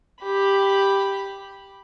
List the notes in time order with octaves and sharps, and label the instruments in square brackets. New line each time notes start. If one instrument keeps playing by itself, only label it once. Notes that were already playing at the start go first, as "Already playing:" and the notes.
[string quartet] G4 B5